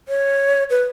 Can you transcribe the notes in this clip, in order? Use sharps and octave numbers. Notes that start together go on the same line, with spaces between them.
C#5
B4